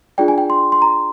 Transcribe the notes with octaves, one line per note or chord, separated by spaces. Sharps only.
D4 F4 G#4 D5 G5
G#5
G5
C6
C6
A#5